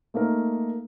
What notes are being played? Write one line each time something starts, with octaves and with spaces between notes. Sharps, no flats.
A3 A#3 D#4 A#4